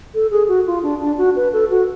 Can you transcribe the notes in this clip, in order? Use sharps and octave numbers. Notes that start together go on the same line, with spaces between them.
A4
G#4
F#4
F4
D4
D4
F#4
B4
A4
F#4